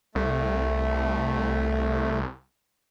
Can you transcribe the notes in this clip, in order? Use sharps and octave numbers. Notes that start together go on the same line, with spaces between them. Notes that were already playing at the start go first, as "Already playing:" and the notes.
C2 A3